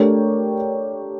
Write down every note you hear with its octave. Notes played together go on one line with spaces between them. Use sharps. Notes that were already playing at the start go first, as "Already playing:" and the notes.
Already playing: A3 D4 G4 A#4 C#5